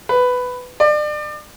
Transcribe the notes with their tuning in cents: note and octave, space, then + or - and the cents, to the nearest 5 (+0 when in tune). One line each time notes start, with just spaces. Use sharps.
B4 +10
D5 +35